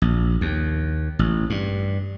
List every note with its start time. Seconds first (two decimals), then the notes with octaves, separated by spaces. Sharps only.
0.02 A#1
0.41 D#2
1.19 A1
1.50 G2